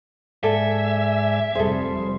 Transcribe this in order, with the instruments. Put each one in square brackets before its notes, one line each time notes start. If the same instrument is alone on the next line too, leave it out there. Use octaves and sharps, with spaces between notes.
[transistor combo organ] G#2 D5 G#5 [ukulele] A4 [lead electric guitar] E5
[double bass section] F1 F2 G3 [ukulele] G#4 A4 [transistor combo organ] C5